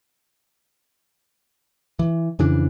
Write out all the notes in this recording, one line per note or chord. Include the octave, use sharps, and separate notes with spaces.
E3
F2 C#3 E3 D4